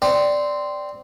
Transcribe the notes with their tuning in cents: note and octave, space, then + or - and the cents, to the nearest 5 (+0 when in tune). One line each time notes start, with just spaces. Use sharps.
C4 -10 D5 +0